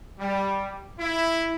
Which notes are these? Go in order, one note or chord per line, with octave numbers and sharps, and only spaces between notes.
G3
E4